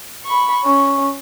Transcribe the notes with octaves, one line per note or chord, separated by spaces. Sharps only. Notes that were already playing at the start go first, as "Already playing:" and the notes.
B5 C#6
C#4 C#6